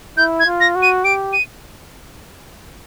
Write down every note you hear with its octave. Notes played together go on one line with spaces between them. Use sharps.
E4 G6
G#6
F4
A#6
F#4
D#7
G4 D7
D#7